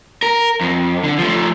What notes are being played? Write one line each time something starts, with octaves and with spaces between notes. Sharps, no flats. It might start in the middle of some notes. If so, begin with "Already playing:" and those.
A#4
F2
D3
F3 A3